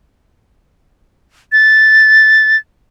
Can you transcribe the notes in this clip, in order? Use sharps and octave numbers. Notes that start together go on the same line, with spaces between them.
A6